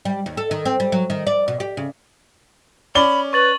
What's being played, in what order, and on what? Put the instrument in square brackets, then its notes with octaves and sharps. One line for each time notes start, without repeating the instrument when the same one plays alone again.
[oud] G3
D#2
A4
D#3
C4
G3
F#3
D#3
D5
B2
G4
C#3
[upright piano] C#4 D5 G7 [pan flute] B5
[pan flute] B4 [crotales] C#6 A6 F#7